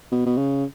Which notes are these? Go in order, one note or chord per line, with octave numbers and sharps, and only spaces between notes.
B2
B2
C#3